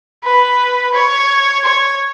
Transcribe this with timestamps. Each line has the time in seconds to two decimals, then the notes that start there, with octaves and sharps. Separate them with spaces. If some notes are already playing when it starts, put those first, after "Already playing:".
0.24 B4
0.94 C#5
1.65 C#5